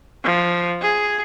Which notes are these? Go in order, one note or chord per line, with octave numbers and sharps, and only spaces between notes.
F3
G#4